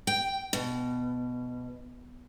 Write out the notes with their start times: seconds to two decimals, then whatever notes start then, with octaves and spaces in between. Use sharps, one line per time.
0.07 G5
0.53 B2